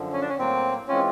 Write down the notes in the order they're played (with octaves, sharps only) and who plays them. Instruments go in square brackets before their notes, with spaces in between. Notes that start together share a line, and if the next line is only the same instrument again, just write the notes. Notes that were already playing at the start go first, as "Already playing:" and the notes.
Already playing: [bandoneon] F#2 D3 F3
[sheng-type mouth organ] C#4
D4
C#4
[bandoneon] A2 F#3 A#3 [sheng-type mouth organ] C4
[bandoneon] E3 G#3 C4 F4 [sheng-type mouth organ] C#4